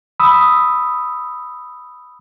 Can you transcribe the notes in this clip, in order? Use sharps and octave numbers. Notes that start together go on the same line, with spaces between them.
B5 D#6 E6